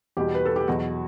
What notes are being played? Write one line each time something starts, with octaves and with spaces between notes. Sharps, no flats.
E2 B2 G3 G4
B4
A4
G4
E2 B2 F#3 F#4